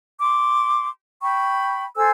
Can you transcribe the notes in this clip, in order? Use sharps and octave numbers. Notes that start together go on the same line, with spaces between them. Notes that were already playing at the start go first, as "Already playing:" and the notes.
C6 D6
G5 B5 C#6
A4 C5 G#5 E6